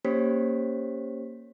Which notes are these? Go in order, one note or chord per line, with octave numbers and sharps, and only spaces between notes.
A#3 C#4 G4 C5 C#5 B6